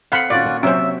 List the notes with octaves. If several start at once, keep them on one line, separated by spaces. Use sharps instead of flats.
C4 A4 F5 F#5 B5
A#2 D#3 C#4 F4 F#4 D5
A#3 C#4
C3 F#3 C#4 F#4 C5 E5